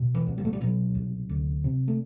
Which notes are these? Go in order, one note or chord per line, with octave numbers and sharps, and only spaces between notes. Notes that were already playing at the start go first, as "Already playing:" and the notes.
Already playing: B2
E3
C2
G3
A3
G3
B2 F#3
C2
D2
C3
A3